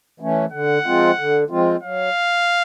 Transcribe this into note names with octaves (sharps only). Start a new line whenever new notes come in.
E3 A3 C#4
D3 F#5
F3 G#3 C4 F4
D3
F3 G#3 C4 F4
F#3 F5